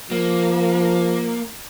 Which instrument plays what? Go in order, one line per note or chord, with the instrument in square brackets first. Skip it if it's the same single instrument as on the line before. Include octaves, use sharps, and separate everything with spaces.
[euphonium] F3 [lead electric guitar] A#3